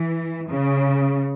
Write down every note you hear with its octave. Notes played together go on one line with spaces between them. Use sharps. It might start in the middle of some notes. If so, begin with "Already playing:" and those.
Already playing: E3
C#3